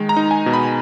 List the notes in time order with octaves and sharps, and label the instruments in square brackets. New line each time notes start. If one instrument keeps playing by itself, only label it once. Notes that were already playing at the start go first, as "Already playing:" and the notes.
Already playing: [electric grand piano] D#3 G#3
A#5
D#4
G#5
B2
B5